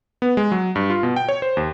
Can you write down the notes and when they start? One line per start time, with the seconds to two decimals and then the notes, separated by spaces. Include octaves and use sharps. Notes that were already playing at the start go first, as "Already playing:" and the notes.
0.22 B3
0.37 G#3
0.52 F#3
0.75 G2
0.90 F4
1.03 B2
1.16 G5
1.29 C#5
1.42 C5
1.57 D#2